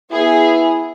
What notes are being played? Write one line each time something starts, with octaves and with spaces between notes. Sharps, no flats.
B3 E4 G#4